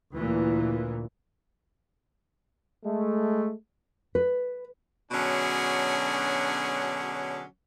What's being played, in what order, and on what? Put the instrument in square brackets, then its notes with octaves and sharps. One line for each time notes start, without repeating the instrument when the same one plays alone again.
[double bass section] D2 A#2 E3
[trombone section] G#3 A3
[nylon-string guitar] B4
[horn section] B2 D3 F#3 C#4 D4 G#4